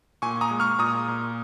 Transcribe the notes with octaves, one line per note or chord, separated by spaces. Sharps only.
A#2 G#5 C#6
A#5 D#6
G#3
C#6 F6
A#2 A#5 D#6
A#2